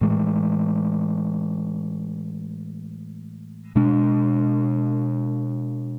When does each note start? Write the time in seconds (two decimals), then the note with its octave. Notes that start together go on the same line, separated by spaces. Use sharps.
0.01 A2 E3 G#3
3.76 B2 G#3 D4